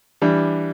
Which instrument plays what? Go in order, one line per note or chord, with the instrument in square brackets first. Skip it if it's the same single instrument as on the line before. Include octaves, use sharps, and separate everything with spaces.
[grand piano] E3 G3 D4